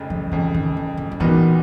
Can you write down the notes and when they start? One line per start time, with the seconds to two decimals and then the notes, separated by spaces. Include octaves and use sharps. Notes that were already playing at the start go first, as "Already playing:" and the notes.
Already playing: F1 F2 C#3
0.10 F3
0.32 F1 F2 C#3 E3
0.54 D#3
0.77 E3
0.97 F3
1.12 F3
1.20 A#2 E3 G3 B3 D#4 F#4